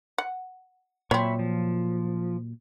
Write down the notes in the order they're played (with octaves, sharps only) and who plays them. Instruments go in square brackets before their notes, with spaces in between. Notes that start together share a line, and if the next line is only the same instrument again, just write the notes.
[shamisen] F#5
[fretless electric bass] A#2 F#3 [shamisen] C4 C#5 [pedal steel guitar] E5 B5 C#6
[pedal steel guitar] F3